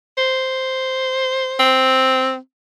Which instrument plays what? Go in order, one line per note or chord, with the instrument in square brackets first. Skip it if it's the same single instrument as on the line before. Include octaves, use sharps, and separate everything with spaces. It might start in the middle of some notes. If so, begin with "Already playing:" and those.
[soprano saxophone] C5
[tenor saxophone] C4